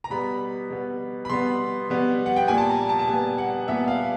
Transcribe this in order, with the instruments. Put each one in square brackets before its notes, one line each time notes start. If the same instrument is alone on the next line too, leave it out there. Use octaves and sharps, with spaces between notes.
[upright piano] A#5
B2 G3 B3 B5
B2 G3 B3
B5
B2 G3 B3 C6
B2 G3 B3
F#5
G5
A#2 G3 B3 G#5
A5
A#5
A5
A5
A#2 G3 B3 G#5
F#5
A#2 G3 B3 E5
F5